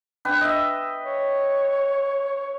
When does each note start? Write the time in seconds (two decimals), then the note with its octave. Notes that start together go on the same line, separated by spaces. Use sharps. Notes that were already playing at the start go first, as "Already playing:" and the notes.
0.25 D4 B4 G5
0.41 D#5 E5
1.04 C#5